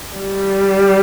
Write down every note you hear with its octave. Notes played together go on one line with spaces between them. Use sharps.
G3